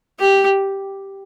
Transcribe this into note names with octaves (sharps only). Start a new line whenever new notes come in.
G4